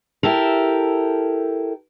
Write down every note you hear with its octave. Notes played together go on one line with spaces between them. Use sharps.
E4 G4 A4 A#4